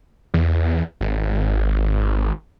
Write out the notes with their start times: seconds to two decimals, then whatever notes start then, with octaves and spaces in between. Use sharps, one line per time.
0.34 E2
1.01 G#1